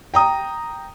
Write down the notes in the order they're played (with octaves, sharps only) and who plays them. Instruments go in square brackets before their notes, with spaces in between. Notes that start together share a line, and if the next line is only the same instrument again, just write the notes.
[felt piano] G5 A#5 D#6